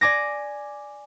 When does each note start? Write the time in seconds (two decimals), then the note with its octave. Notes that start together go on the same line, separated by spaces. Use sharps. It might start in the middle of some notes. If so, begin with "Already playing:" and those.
0.01 D5 G#5 D6 A#6